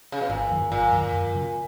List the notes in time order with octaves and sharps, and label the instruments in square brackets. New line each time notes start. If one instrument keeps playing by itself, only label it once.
[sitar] C#3
B2
[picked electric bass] G#1 [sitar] A#2
[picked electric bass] F#2 D#3 F#3
[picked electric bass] G#1 [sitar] A#2
[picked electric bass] F#2 D#3 F#3
F#2
C#3 F#3